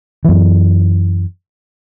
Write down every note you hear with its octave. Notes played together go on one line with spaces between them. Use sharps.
F#2 E3